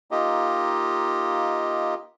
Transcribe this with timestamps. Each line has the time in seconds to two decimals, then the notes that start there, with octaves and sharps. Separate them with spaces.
0.11 A#3 D#4 F4 G4 D#5